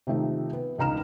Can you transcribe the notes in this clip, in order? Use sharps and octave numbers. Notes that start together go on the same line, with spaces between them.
C3 D#3 F3 A3 D#4
B3
E1 C#2 D#4 A#5 F6 E7